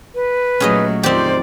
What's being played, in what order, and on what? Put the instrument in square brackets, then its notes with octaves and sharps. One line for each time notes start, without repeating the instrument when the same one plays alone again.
[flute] B4
[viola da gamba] A#2 F#3 A3 [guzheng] C#4 G#4 D#5
[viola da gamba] F2 D#3 D5 [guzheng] C4 G4 [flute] C5